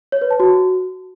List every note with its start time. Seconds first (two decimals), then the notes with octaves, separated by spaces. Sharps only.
0.12 C#5
0.21 B4
0.31 A5
0.40 F#4